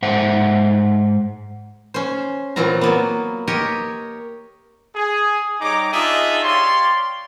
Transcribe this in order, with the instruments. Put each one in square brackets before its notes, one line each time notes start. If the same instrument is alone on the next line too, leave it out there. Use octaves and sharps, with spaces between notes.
[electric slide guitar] G#2 C5 E5 F#5
[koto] C#4 C5
A#2 E3 F#3 C4 F4 A#5
F#3 A#3 B3
G4 A#4 C#5 D#5
[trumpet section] G#4
G3 D#4 C#5 A#5 D6
D4 D#4 F4 G#4 D#5 E5
G4 C#5 D5 F5 C6